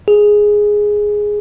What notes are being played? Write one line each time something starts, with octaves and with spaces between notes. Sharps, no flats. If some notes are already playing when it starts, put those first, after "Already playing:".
G#4